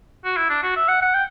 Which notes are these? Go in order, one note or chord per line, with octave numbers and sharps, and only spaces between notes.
F#4
E4
D4
F#4
E5
F#5
F#5
G5